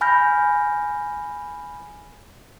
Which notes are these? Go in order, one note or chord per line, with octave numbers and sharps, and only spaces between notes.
G#5 B5 F6 G6 A#6